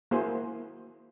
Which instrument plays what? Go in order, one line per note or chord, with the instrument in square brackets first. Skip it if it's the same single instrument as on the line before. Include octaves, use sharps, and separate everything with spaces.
[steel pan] A#3 E4 F#4 G#4 C5